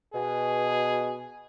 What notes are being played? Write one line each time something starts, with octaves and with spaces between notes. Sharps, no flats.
B2 G#4